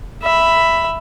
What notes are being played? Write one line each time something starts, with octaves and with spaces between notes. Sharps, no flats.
E5 B5